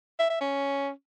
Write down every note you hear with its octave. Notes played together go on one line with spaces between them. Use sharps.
E5
E5
C#4